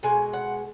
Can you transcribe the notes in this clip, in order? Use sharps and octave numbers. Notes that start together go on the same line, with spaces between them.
B2 G#3 G#5
F#5